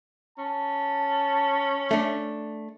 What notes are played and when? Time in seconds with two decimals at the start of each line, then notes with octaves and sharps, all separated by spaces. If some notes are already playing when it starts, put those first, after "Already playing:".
0.38 C#4 A5
1.91 A3 D4